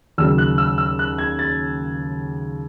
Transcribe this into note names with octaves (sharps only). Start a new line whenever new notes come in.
D#2 C#3 F#3 E6
F#6
E6
E6
F#6
G#6
A6